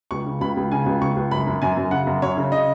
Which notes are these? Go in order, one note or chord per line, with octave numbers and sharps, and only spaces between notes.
C#2 C#6
C#3
C#2 B5
C#2
C#3 G#5
C#2
C#2 C#6
C#2
F#2 B5
F#2
F#2 G#5
F#2
C#3 F#5
F#2
F#2 C#5
C#3
C#3 D#5